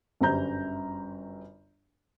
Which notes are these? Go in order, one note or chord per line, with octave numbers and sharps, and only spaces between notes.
G1 F#2 G3 C5 A#5 G6